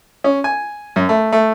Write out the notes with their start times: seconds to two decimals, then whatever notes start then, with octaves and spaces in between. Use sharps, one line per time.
0.24 C#4
0.44 G#5
0.96 F#2
1.09 A3
1.32 A3